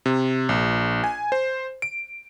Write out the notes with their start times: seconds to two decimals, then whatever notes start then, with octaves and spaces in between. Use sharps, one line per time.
0.06 C3
0.49 A#1
1.04 G#5
1.32 C5
1.82 D7